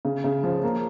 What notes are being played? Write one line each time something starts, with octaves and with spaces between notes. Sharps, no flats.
C#3
C#3
F3
A#3